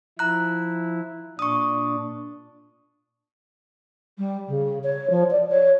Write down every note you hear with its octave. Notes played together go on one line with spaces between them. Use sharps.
F3 E4 A#5 F#6
A#2 D4 C#6 D#6
G3
C#3
C#5
F3
D5
C#5